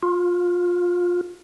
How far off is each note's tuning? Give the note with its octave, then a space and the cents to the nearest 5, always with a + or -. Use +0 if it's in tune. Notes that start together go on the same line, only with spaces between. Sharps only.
F4 +20